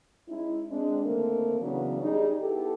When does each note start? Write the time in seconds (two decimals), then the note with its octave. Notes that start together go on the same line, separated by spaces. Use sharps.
0.28 G#3 C#4 D#4 E4
0.71 G#3 C4 D4
1.04 D2 D#3 A3 A#3 C4 A#4
1.60 C#3 E3 F#3 B3 C#4 D4
2.02 G3 D#4 G#4
2.42 B3 E4 G4 A4